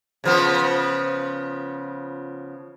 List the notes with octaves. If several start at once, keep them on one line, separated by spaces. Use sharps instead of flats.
C#3 F3 B3